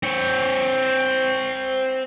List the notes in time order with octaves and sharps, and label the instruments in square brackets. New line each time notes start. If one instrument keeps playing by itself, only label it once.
[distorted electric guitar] C4 C#5